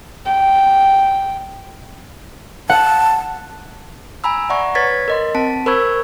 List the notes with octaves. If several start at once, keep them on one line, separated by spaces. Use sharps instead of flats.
G5
F#5 A5
G#5 A#5 B5 E6
D5 E5 F#5 A#5 C#6
B4 C#5 G#6 A6 B6
A#4 D#5 C6
C4 A5 B6 D7
A#4 C5 B5 C#6 E6 G#6